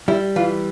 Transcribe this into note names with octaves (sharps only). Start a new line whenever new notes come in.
G3 E4
E3 F4